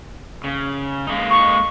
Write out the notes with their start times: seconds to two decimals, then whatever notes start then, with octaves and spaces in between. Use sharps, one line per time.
0.44 C#3
1.07 G#3 A#3 D#4
1.30 C#6